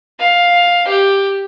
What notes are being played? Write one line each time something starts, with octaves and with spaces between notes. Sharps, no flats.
F5
G4